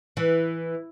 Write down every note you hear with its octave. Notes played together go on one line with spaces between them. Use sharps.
E3